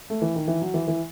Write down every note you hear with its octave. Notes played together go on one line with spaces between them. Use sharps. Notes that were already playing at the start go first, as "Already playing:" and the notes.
A3
E3
D#3
E3
F#3
E3
E3